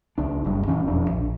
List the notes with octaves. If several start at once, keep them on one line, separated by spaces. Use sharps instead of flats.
C#2 D4
F#1 G2
A#2 E3 C#4
E1 F2 D4
A#1